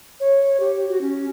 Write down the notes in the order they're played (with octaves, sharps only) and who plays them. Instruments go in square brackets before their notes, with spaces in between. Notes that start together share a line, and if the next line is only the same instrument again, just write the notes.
[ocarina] C#5
G4
F#4
C#4